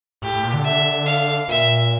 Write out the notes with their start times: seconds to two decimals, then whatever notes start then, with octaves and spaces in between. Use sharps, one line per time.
0.22 A2 G4
0.33 A2
0.44 A#2
0.54 D3
0.64 E5
1.06 F5
1.48 A#2 E5